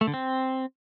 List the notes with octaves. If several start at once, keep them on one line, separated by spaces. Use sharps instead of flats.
A3
D3
C4